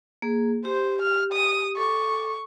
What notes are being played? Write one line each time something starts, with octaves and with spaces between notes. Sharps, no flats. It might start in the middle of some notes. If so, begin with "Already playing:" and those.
A#3 G#4
G4 C5
F6
D#6
A4 C#6 D6